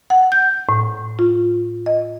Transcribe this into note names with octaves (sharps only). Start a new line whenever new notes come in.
F#5
G6
A2
F4
D#5